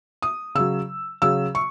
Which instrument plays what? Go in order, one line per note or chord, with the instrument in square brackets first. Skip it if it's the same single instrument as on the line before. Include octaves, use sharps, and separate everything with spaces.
[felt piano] D#6
C#3 F#3 E6
C#3 F#3 E6
C#6